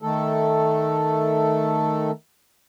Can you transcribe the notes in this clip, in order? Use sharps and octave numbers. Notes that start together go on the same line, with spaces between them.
D#3 A3 A4